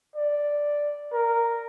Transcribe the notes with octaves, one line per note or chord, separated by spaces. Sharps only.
D5
A#4